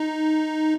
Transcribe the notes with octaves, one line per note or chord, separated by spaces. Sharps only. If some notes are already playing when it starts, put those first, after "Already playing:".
Already playing: D#4